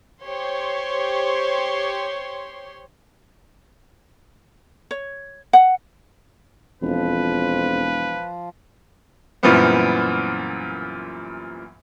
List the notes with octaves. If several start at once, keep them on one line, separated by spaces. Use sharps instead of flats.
G4 C5 C#5 C6
C#5
F#5
E1 F2 F3 B4
F#2 A#2 E3 G3 B3 C4